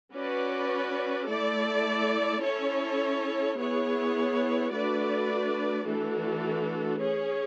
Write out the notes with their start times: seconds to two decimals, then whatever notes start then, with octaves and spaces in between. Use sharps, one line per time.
0.13 C#4 F#4 B4 D5
1.28 A3 E4 A4 D5
2.42 C#4 E4 A4 C#5
3.57 B3 E4 G#4 C#5
4.71 A3 D4 F#4 B4 D5
5.85 E3 A3 D4 F#4 A4
7.00 C#4 G#4 C#5